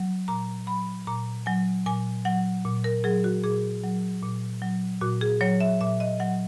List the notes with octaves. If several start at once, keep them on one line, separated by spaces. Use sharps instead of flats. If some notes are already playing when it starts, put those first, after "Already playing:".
Already playing: F#3
A#2 A#5
F#3 B5
A#2 A#5
F#3 G#5
A#2 G#5
F#3 F#5
A#2
A#4
F#3 G#4
F#4
A#2 G#4
F#3
A#2
F#3
A#2 F#4
G#4
F#3 C#5
E5
A#2 E5
D#5
F#3 F#5